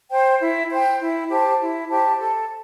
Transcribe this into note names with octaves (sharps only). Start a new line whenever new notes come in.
C5 G5
E4
C5 G5
E4
G4 C5 A5
E4
G4 C5 A5
A4